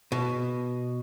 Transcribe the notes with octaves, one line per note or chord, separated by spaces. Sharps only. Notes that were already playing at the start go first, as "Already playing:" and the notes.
B2